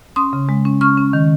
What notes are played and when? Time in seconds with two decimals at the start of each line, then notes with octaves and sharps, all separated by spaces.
0.16 C#4 C6 D#6
0.33 C#3
0.49 G#3
0.65 C#4
0.81 C#4 C#6 F6
0.97 C#4
1.13 D#3